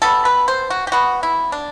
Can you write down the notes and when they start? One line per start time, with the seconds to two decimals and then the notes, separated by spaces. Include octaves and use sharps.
0.02 B2 G3 B3 A4
0.25 B4
0.48 C5
0.70 F#4
0.87 G4
0.92 B2 G3 B3 F#4
1.23 E4
1.52 D4